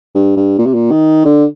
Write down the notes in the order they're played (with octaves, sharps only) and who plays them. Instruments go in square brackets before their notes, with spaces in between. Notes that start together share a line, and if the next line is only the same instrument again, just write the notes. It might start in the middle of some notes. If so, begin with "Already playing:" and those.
[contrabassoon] G2
G2
A#2
C3
A#2
D#3
D3